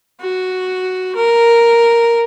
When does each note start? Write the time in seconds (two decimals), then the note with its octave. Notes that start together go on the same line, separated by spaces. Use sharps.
0.21 F#4
1.16 A#4